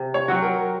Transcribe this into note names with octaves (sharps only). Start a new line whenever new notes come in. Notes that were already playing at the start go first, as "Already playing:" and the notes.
Already playing: C3
C#5
F#3 C4 F#4
A#4